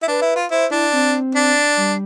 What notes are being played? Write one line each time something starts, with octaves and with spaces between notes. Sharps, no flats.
E4
D4 B4
E4
F4
E4 C5
D4 E4
C4
D4
G3